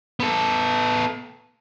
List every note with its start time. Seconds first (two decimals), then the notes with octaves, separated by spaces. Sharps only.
0.20 B3 A4